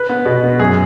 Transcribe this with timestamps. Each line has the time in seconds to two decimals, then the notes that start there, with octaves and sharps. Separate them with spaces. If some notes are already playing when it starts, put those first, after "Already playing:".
Already playing: B4
0.09 B3
0.26 B2
0.44 B3
0.59 F#2 G#4